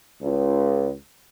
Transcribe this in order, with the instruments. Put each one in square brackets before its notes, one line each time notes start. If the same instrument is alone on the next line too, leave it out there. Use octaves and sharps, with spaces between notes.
[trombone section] C#2